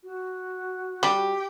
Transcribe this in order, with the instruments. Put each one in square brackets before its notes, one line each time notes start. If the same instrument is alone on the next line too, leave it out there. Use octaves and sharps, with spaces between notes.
[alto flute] F#4
[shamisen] G3 [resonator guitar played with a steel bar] G4